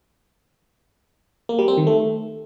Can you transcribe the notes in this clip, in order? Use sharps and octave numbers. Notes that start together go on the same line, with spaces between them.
A#3
G3
C4
D#3
A3